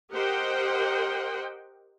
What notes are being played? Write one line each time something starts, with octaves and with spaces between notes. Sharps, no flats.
G4 A#4 C5 D#5 F#5 G5